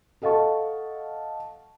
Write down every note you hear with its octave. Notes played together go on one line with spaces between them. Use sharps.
A4 D#5 F5 F#5 A5 C#6